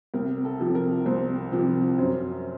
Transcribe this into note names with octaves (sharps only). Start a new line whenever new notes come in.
C2 A#4
A4
C3 F3
A#4
C2 C5
C3 F3
F#2 C5